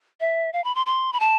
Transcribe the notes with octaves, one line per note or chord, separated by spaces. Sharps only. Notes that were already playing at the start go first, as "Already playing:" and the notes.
E5
F5
B5
C6
C6
B5
A5